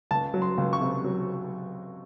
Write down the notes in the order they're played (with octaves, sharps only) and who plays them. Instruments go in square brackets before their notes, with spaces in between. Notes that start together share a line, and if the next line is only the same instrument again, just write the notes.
[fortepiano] C#2 A5
F#3
C6
C#2
C#6
C3
F#3